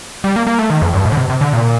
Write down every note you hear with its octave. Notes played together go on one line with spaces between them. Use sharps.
G3
A#3
A#3
A3
D#3
F2
G2
A2
D3
C3
C3
D3
A#2